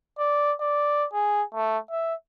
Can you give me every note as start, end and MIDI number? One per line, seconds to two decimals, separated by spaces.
0.19 0.53 74
0.61 1.06 74
1.13 1.43 68
1.55 1.78 57
1.91 2.15 76